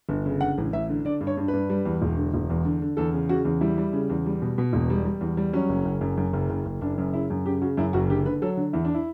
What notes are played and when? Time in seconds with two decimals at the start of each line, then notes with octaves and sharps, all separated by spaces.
0.09 G1
0.26 C#3
0.41 D3 F#5
0.58 A1
0.73 A1 E5
0.89 D3
1.05 D3 D5
1.21 G2
1.27 C#5
1.37 G2
1.48 B4
1.53 G2
1.70 G3
1.85 E2
2.02 E1
2.17 D3
2.34 E1
2.50 E2
2.65 D3
2.82 D3
2.97 E2 A4
3.13 C#3
3.29 C#3 F#4
3.45 E2
3.61 G3 E4
3.78 G3
3.93 C#3
4.10 E2
4.26 G3
4.42 B2
4.58 B2
4.73 E1
4.90 G3
5.05 G3
5.21 E2
5.37 G3
5.53 F#3 C#4
5.69 F#1
5.85 F#1
6.01 F#2
6.17 F#2
6.33 F#1
6.50 F#1
6.65 F#1
6.81 F#1 D4
6.98 F#2
7.13 C#3 E4
7.30 F#2
7.46 C#3 G4
7.62 C#3 F#4
7.77 F#2 E4
7.93 F#1 F#4
8.09 D3 G4
8.25 D3 B4
8.42 F#3 A4
8.57 D3
8.73 E2 E4
8.85 D4
8.94 E4